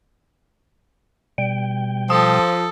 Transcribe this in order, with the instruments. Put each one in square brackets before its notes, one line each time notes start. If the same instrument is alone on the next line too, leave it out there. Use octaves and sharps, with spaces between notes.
[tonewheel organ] B2 G3 G5
[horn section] F3 [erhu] A4 [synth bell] D#6